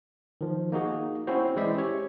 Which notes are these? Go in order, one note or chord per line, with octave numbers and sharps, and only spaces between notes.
D#3 F3
A#3 D#4 F#4 G#4
C4 C#4 E4 F#4 C5
E3 G#3 E4 C5 D5 E5
C#4 G4 C#5